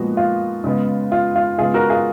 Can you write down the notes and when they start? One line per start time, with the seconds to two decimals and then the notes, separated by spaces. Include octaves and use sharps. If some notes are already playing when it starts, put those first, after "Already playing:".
Already playing: A#2 F3 G#3 B3 F#4
0.17 F4
0.64 C#3 G#3 B3
1.12 F4
1.36 F4
1.59 C#3 G#3 B3 F4 G#4
1.74 F#4 A#4
1.90 F4 G#4